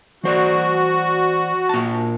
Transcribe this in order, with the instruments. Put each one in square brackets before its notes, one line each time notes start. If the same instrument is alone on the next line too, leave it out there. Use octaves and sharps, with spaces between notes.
[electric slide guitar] E3 C5 D5 [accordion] F#4
[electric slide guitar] A#2 A5